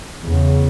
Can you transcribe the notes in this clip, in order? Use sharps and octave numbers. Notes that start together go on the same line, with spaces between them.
E2 C#3